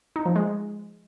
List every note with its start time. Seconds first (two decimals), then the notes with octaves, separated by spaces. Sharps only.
0.16 D#4
0.26 F3
0.36 G#3